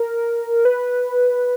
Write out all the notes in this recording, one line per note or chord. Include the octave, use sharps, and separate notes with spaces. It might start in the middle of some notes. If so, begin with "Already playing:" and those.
Already playing: A#4
B4